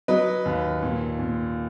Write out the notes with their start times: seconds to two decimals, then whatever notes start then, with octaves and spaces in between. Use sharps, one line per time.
0.08 F#3 B4 D#5
0.45 D#2
0.83 A#2
1.19 A#2